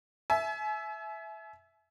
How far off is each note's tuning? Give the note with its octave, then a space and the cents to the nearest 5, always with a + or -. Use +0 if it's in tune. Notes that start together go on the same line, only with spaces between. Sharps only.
E5 +0 G#5 +40